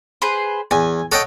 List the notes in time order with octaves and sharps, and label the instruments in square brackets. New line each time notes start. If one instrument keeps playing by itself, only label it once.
[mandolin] G#4 B4 C5
[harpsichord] E2 [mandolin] G#5
[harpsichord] A4 D#5 G5 [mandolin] C#5 F#5